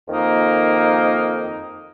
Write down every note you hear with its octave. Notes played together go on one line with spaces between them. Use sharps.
F2 D#3 A#3 D#4